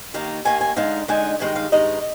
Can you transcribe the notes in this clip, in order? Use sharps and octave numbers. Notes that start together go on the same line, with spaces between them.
D#2 D#3 A#3 A#5
D#2 D#3 A#3 G#5
G#5
D3 G#3 D#4 F5
D3 G#3 D#4 G#5
G2 D#3 G#3 D#4 G5
F5
G2 D#3 G#3 D#4 D#5